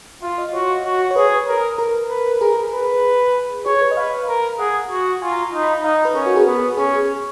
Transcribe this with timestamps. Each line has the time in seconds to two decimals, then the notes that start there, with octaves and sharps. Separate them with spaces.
0.22 F4 F5
0.38 D#5
0.54 F#4 C#5
0.85 F#4
1.11 C#5
1.16 G#4 B4
1.47 A#4
1.78 A#4
2.10 B4
2.41 G#4 A#4
2.72 B4
3.66 G#4 C#5
3.81 B4
3.91 D#5
3.97 B4 F5
4.28 A#4
4.59 G#4 F#5
4.90 F#4
5.22 F4 G#5
5.32 A#5
5.43 A#5
5.53 D#4 A#5
5.63 B5
5.74 A#5
5.84 D#4 F5
6.05 B4
6.15 C#4 A#4
6.26 F#4
6.36 G#4
6.47 B3
6.77 C#4 G#4
6.94 G#4